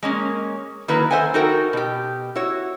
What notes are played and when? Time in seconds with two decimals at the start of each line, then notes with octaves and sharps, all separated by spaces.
0.03 G#3 A#3 C#4
0.88 D#3 F#3 A#3 D#4 E4 B4
1.11 A4 C5 E5 F#5 G#5
1.34 D#4 F#4 A4 A#4 G5
1.73 B2 G4
2.35 E4 F#4 C#5